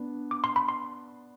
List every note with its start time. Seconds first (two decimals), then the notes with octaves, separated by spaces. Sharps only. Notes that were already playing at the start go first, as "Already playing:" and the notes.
Already playing: B3 D4
0.31 D6
0.44 C6
0.56 B5
0.68 C6